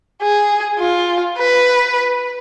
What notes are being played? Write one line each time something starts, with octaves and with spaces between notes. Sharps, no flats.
G#4
F4
B4